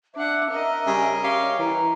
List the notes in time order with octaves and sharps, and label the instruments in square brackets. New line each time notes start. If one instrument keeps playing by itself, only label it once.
[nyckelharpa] D4 F#5 [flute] E5
[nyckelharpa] A#4 D#5
[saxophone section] C#3 G3
G4 C#5 F5
[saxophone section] E3 [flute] A#5